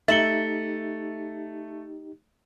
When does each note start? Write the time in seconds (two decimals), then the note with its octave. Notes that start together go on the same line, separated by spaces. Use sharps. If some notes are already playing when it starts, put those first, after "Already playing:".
0.08 A3 D#4 G4 E5 A6 C#7 F#7 G7